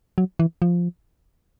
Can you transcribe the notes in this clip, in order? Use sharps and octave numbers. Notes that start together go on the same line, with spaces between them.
F#3
E3
F3